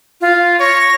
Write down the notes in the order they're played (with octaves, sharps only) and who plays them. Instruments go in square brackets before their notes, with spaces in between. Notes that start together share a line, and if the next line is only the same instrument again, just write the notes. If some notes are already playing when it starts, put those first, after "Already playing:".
[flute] F4
[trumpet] C#5 [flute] A#6